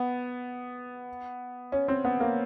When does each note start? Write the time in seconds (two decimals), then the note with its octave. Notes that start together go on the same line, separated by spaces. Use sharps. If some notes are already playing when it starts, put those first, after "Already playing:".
Already playing: B3
1.72 C#4
1.88 C4
2.05 B3
2.20 A#3